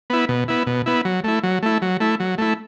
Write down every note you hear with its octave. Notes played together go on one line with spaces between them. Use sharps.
B3 E4
B2
B3 E4
B2
B3 E4
F#3
A3 E4
F#3
A3 E4
F#3
A3 E4
F#3
A3 E4